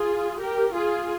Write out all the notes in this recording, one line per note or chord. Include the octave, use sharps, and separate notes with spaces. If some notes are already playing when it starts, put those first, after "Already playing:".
Already playing: F4 G#4
G4 A#4
F4 G#4